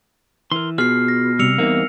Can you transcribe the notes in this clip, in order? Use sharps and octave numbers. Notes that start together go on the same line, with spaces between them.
E3 A#4 C6
B2 F4 G#4 B4 F6 C7
A#6
C3 G3 E6 C#7 F7
E2 G3 A#3 C4 D#4